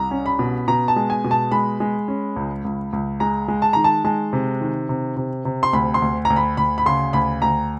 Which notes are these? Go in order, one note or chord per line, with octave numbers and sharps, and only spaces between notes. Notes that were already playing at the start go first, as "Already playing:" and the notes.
Already playing: C2 A#5
C#4
B5
B2
B2 A#5
A5
G#3
G#5
B2
A5
G#3 B5
G#3
C#4
C#2
C#2
C#2
G#3 A#5
G#3
A5
D#3 A#5
A5
G#3 A5
C3
D#3
C3
C3
C3
C6
D2 B5
C6
D2
A#5
D2
B5
D2 B5
B5
C#3 C6
D2 B5
D2 A#5